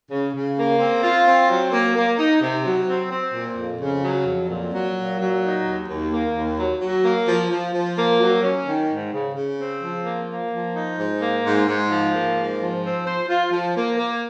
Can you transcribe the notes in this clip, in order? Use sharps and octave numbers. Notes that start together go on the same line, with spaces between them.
C#3
C#3
A#3
C4
F4
C4
F#3
A#3
A#3
D#4
C3
F#3
C4
C4
A#2
F2
C#3
F#3
F2
A#2
F#3
A#2
F#3
D#4
D#2
D#2
A#3
D#2
F#3
F#3
A#3
F3
F3
F3
A#3
F#3
C#4
D#3
G#2
C#3
C#3
C4
F3
A#3
A#3
F3
D#4
G#2
A#3
G#2
G#2
F3
A#3
G#2
F3
C4
C5
F4
F3
A#3
A#3